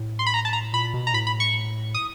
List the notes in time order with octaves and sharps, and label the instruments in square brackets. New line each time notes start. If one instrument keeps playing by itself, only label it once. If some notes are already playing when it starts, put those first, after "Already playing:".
Already playing: [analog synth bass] A2
[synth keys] C6
B5
A#5
A5
A#5
[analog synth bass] A#2 [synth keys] B5
[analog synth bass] B2
[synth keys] A#5
[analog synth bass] A2 [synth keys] B5
[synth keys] B5
C#6
D#6